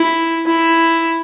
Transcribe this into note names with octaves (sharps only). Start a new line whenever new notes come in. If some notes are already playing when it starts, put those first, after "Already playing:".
Already playing: E4
E4